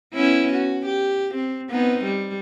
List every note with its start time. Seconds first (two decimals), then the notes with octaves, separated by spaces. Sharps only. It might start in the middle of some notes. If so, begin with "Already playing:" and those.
0.14 B3 C#4 E4
0.53 F#4
0.86 G4
1.34 C4
1.70 B3 C4 D#4
2.04 G3